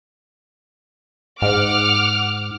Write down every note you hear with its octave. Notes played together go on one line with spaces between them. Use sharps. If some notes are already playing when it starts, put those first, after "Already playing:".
G#2 F#5 D6 F6